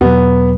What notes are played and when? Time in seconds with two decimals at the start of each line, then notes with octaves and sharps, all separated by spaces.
0.01 E2 B2 F#3 B3